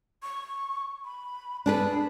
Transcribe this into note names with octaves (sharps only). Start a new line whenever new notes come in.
C#6
B5
D4 G#4 B4 A5